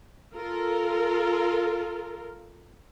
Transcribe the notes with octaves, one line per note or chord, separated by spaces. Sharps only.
F4 A4 A#4